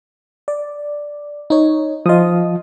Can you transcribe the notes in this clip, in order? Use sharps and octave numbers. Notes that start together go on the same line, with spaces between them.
D5
D#4 C#5
F3 F4 D#5 D#6